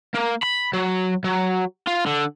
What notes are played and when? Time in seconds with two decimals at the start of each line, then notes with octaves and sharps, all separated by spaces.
0.14 A#3
0.43 B5
0.73 F#3
1.24 F#3
1.87 F4
2.06 D3